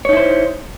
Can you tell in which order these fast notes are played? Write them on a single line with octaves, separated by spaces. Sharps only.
C#5 D#4 E4 C5